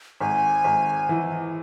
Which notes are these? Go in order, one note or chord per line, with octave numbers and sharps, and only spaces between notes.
G#1 G#5
G#1
E3